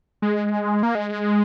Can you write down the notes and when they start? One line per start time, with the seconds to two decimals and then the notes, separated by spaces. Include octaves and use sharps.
0.22 G#3
0.83 A#3
0.95 G#3